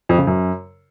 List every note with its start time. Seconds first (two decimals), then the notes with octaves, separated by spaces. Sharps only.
0.09 F2
0.18 C#3
0.27 F#2